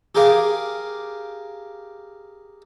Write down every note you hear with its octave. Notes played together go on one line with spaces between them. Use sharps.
G4 G#4 A#4 F5 D6